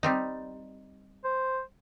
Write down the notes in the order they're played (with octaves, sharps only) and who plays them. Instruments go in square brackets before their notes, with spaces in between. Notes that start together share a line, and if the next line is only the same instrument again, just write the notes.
[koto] G3 C4 D#4
[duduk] C5